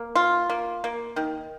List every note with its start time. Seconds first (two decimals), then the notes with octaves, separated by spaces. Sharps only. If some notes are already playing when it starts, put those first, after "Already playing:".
Already playing: A#3
0.15 F4
0.50 A#3
0.84 A#3
1.16 D#3